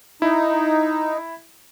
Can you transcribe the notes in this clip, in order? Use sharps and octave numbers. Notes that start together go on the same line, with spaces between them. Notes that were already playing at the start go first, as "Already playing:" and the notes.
D#4 E4